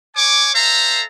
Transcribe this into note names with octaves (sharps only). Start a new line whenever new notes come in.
C#5 G#5 D6
A4 C5 E5 F5 A#5